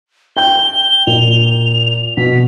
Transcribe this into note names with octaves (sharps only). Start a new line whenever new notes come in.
G5 G6 G7
A#2 F7
B2 B6